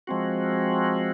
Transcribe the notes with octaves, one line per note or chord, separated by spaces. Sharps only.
F3 G#3 C4 F#4